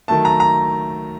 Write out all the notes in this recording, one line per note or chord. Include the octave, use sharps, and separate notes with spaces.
D#3 F#3 A3 A5
A#5
A#5